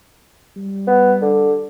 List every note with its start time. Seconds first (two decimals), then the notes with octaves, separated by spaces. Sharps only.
0.57 G3
0.87 B3
1.22 D3